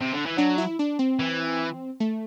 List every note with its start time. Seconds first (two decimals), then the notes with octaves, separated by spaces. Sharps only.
0.01 C3
0.13 D3
0.26 E3
0.38 F#3 D4
0.58 E4
0.79 D4
0.99 C4
1.19 E3
2.00 A3